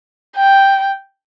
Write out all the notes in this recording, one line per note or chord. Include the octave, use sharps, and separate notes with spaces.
G5